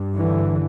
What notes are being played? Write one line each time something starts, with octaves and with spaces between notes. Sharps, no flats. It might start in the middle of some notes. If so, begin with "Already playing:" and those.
Already playing: G2
D3 E3